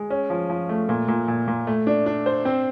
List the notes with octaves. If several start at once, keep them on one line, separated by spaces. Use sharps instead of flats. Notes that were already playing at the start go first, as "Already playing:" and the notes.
Already playing: G#3
C#4
F3
F3
A3
A#2
A#2
A#2
A#2
A3
D4
D4
C5
C4